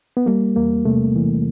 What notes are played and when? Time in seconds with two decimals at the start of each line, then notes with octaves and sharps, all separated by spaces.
0.17 B3
0.26 G3 A#3
0.56 E2 A#3
0.85 C3 A3
1.16 E3